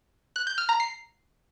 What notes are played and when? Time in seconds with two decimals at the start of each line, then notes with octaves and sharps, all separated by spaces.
0.36 F#6
0.47 G6
0.58 F6
0.69 A#5
0.80 C7